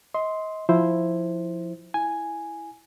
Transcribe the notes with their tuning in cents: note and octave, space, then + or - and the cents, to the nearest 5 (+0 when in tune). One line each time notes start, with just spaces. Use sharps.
D#5 +30 C6 +0
F3 +0 E4 +0 C5 +0
E4 +0 G#5 +0